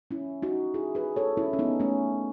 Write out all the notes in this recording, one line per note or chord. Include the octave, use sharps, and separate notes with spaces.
C#4 E4
D#4 F#4
E4 G#4
G#4 B4
A4 C#5
C#4 E4
C#4
B3 D#4
A3 C#4